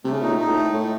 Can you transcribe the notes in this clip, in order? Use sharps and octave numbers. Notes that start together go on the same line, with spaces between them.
C3 A3
C#3
A#2 D#4
A2
A#2 D#4
A2
A3
A2 A3